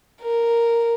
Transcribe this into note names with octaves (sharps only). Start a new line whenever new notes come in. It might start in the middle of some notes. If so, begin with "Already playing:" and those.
A#4